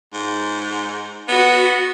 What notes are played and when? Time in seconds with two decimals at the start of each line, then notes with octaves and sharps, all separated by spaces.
0.13 G#2
1.28 B3 F#4